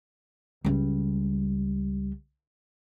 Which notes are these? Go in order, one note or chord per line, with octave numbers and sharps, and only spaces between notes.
C#2 G3